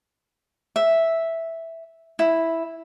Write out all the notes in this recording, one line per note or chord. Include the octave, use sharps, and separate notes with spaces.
E5
E4